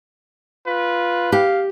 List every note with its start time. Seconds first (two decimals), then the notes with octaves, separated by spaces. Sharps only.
0.67 F4 B4
1.32 G4 F5